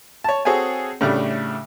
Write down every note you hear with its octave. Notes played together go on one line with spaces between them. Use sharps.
C#5 A5
C4 F#4 G#4 A4 C#5 G#5
A2 C#3 G3 A3 D4